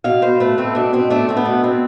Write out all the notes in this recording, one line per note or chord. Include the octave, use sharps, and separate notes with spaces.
B2 F5
B2 C5
A3 B4
A3 C4
B2 D4
B2 C4
A3 D4
A3 C4
B3
B2
B2 C4